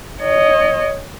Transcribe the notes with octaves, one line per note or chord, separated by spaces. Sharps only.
C#5 D#5